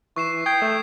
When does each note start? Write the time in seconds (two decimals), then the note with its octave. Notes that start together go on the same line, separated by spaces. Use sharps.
0.16 E3 C#6 C7 E7
0.46 G5 D#6 G#6 C7
0.61 A3